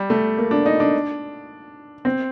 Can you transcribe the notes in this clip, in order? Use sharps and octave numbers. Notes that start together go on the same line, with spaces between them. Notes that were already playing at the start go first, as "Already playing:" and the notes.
Already playing: G3
A3
A#3
D4
D#4
D4
C4